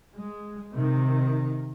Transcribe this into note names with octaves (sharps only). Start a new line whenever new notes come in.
G#3
C3 D#3